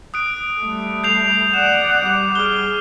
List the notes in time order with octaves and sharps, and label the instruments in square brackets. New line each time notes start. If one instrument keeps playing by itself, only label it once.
[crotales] D#6 F#6 D7
[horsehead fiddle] G3 A3
[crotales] G6 C7 F7
[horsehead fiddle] D5 F#5 [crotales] E7
[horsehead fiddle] G3 [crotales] D6
[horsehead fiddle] G#4 [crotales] F6 G7